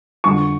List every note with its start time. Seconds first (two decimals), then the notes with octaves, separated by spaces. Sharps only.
0.24 F2 D3 G3 C#6